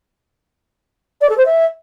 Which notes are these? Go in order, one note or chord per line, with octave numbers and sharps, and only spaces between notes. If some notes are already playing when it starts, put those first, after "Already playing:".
D5
A4
C5
E5